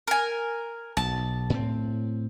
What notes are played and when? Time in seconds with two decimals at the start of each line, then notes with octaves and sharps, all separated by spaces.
0.07 A#4 G#5
0.97 B1 A5
1.50 A2 C4